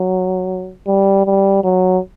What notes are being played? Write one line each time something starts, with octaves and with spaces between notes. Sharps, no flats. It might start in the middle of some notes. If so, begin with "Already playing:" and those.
Already playing: F#3
G3
G3
F#3